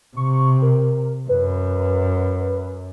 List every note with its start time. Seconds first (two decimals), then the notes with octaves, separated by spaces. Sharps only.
0.17 C3 C#6
0.62 A#4
1.29 F#2 B4